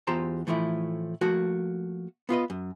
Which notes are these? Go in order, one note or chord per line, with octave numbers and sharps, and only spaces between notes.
E2 F4 G4 C5 A5 A#5
A2 E3 F3 A3 E4
F3 A3 A#3 F#4
B3 F4 B4 D#5
F#2